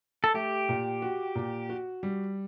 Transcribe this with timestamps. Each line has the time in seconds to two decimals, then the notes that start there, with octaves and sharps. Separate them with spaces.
0.24 A4
0.34 A3 G4
0.69 A#2
1.02 F#4
1.35 A#2
1.69 F#4
2.03 G3